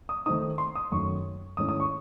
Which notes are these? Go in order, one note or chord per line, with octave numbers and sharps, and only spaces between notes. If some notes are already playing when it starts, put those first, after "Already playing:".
D#6
D#3 A3 C4 D#4 D#6
C6
D#6
F#2 D#3 A3 C#6
G#2 D#3 A3 C#4 E4 D#6
D#6
C#6